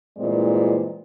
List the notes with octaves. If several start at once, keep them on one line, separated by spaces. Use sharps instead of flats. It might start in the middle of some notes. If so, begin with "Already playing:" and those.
G2 A#2 E3 G#3 C4 D5